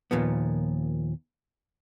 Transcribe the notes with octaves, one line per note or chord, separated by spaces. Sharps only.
D#2 A#2 F3 B3